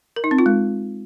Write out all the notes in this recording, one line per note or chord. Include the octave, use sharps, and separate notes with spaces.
A#4
D#4
C4
F4
G#3